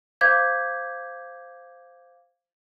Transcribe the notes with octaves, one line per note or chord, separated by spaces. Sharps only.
C5 F5 D6 G6 G#6 B6